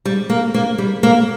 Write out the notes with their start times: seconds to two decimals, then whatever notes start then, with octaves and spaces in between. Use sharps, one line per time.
0.05 G3
0.30 A#3
0.54 A#3
0.78 G3
1.03 A#3